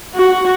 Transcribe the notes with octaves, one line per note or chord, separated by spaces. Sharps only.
F#4